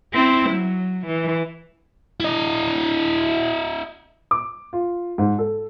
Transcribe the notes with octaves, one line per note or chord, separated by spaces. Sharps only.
C4 E4
F#3
E3
E4 D#5
D6
F4
G#2
A4